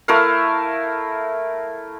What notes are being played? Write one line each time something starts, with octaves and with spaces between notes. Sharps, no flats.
A3 E4 A#4 F5